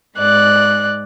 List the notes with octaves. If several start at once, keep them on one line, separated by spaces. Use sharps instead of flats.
G#2 D5 F#6